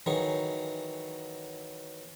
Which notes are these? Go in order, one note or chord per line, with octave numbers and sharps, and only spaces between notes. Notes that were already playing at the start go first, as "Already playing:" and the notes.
D#3 E3 F#3 G#4